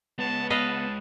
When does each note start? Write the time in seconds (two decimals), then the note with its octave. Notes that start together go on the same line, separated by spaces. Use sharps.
0.19 G#3 B3 C#5 A5
0.50 B4 D#5 F5 A5